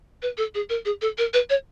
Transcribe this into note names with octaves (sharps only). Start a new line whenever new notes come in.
B4
A4
G#4
A#4
G#4
A4
A#4
B4
C#5